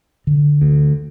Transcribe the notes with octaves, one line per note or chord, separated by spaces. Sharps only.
D3
D2